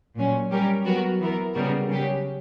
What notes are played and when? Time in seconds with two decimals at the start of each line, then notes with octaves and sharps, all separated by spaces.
0.16 A#2 F#3 C#4
0.50 G3 C#4 G4 A#4
0.85 F#3 B3 F#4 A#4
1.20 E3 B3 E4 A#4
1.54 C#3 G3 B3 F#4 A#4
1.89 C#3 F#3 C#4 G4